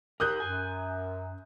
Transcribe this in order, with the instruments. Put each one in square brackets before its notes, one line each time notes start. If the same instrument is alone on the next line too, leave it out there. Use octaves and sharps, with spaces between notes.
[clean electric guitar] G4 A#4 [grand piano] D#6 F#6 G6
[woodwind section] F#2 [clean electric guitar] G#5